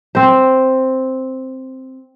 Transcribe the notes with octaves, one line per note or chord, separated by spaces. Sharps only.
C4 C5